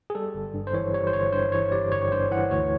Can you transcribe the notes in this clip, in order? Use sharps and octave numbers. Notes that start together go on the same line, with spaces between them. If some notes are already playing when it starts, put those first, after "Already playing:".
G#4
G3 A4
G1
G2
C5
E3 C#5
G3 C#5
C5
G1 C#5
G2 C5
E3 C#5
G3 D5
G1 C#5
G2 C5
E3 F#5
D2 C#5